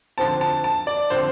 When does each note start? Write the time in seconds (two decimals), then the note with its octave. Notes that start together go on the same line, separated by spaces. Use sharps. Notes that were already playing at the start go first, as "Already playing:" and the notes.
0.18 D3 F3 C4 A5
0.41 A5
0.64 A5
0.87 D5
1.10 D3 F3 C4 C5